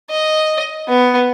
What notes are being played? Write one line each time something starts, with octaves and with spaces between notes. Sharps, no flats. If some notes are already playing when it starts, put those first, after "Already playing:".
D#5
B3